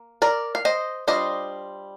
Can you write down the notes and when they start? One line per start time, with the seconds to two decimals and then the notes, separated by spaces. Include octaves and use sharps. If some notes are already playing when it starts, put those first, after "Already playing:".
Already playing: A#3
0.22 A#4 D5
0.55 F5
0.65 C5 D#5
1.07 G3 D4 F4 C5 D#5